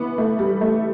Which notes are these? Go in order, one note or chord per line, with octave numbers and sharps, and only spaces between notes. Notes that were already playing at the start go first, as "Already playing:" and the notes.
Already playing: E3 B3
A3
G3
A3